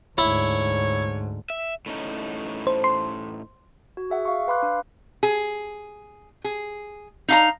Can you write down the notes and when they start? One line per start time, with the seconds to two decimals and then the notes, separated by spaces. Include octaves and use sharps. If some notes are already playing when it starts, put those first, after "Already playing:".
0.18 D2 G#2 E4 C#5
1.50 E5
1.86 A2 C#4 D#4
2.67 C5
2.84 C6
3.97 F#4
4.10 G#4 E5 F#5
4.25 F5 C#6
4.48 B4 F5 B5 C6 D6 F#6
4.63 D4
5.23 G#4
6.44 G#4
7.28 D#4 F5 A#5